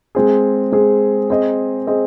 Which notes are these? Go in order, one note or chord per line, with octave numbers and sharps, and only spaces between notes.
G#3 C4 G#4
G#3 C4 G#4
C4 G#4 C5 D#5
C4 G#4 C5 D#5